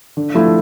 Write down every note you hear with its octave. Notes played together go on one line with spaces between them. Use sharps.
D3
F3 A3 E4